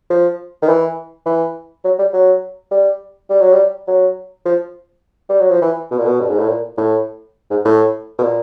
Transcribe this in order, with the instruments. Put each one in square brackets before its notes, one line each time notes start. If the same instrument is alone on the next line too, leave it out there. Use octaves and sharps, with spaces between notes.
[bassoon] F3
D#3
E3
E3
F#3
G3
F#3
G3
G3
F#3
G3
F#3
F3
G3
F#3
F3
E3
B2
A#2
B2
G2
G#2
A2
A#2
A2
G#2
A2
B2
A#2